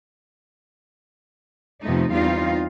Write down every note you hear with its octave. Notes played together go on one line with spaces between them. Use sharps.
F2 C3 F3 A3 B3 D#4
E2 G3 C4 D#4 F4 F5